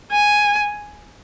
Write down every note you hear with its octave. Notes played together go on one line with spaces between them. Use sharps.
G#5